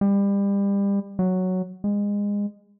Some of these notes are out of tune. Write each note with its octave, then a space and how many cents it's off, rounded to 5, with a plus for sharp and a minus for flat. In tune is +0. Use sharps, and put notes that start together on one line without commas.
G3 +30
F#3 +0
G#3 -25